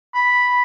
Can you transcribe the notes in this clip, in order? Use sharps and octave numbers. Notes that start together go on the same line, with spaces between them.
B5